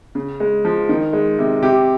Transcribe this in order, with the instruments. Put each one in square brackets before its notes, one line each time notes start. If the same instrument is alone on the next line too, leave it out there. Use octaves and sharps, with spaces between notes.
[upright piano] C#3
G#3
F3
D#3
G#3
C3
C3 G4